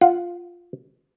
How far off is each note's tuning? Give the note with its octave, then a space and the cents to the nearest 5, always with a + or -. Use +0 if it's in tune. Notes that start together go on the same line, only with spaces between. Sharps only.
F4 +0 F#5 +0